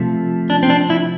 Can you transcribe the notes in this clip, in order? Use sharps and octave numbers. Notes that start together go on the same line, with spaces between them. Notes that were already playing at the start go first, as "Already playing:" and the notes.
Already playing: C3 F3 A3
D4
C4
D4
E4